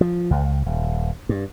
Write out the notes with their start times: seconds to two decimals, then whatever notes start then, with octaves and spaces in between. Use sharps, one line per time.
0.01 F3
0.31 C#2
0.66 D#1
1.29 G2